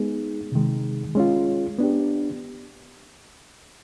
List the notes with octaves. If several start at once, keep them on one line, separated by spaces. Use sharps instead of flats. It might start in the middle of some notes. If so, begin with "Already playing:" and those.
Already playing: G#3 B3 D#4 G#4
C3 D#3 G#3
G#3 C#4 F4
B3 D4 G4